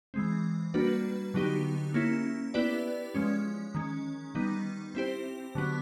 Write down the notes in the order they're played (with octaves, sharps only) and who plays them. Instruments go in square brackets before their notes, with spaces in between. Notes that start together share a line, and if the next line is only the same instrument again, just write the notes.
[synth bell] E3 G#3 C4
G3 A#3 D4 F#4 B4
D3 F#3 B3 D#4 G4
A#3 C#4 E4
B3 E4 G4 B4 D5
F3 G#3 C#4
D#3 G#3 C#4
D#3 G3 B3 D#4
C4 E4 G4 C5
D3 F#3 B3